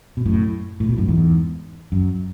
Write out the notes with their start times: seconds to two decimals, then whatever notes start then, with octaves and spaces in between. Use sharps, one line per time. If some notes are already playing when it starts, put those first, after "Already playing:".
0.17 B2
0.25 F#2 A2
0.80 A2
0.89 B2
0.98 F#2 A2
1.08 E2 G#2
1.92 F#2